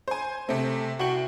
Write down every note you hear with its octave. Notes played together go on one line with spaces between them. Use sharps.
C5 G#5
C3 A3 C4
C2 F#4 G5 F#7